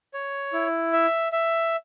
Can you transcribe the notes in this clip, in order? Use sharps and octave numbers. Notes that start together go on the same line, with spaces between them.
C#5
E4
E5
E5